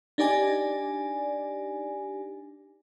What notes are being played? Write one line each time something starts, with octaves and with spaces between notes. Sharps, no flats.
D4 D#4 G4 D5 G#5